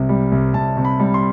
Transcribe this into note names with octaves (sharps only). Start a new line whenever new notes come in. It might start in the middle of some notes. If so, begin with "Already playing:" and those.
Already playing: C2 C3
G3
C2
C2 A5
C3
B5
G3
C6